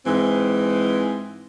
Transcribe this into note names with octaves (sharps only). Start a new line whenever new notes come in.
G#2 E3 G#3 C4